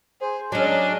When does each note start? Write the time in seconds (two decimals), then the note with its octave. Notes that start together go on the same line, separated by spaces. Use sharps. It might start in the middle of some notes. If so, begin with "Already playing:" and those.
0.21 G#4 C5
0.52 F#3 G#3 C#4 D4 D5 D#5